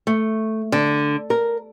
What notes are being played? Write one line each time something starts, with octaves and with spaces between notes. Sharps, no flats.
A3
D3
A#4